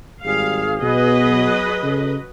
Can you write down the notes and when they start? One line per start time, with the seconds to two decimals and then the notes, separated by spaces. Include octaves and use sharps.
0.25 G#1 G3 G#4 F5
0.82 B2 F#3 B3 B4 D#5
1.83 C#3 A4